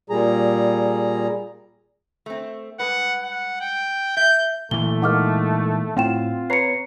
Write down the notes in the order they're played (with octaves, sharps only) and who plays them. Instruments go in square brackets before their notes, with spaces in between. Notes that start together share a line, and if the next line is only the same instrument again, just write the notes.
[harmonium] A#2 G3 G#4 A#5
[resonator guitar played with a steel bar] A3 C4
[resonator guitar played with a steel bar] G2 G#3 B4 [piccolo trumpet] F#5
[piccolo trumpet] F#5
G5
[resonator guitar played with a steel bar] E5 [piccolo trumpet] G6
[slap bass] A#2 E3 [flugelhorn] A3 [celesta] G7
[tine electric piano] G#3 A#3 D#4 [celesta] F#5 D6 F6
[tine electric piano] A2 [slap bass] C4 [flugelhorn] F4 [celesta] F#5 G5 E7
[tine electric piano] B4 C#5 A#5 [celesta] C7 C#7